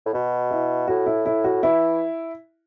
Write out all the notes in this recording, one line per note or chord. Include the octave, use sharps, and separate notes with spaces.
A2
B2 F#4
E4
A2 F#4
E4
E4
F#4
E3 E4